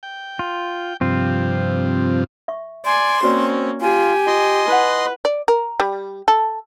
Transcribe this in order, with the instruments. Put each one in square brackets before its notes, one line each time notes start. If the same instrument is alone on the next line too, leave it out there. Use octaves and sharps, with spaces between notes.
[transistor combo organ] G5
[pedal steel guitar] F4
[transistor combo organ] G2 C3 F3 [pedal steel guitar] C4 F4
[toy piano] E5 C#6
[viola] D5 G#5 [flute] C6
[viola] A#3 C#4 [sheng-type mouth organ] C4 [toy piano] F#4 C5 D5
[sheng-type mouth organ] F4 [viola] G4 [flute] G#5
[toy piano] F4 [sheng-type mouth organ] D#5 C6
[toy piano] E4 F#5 [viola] B4
[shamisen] D5
A#4
G3
A4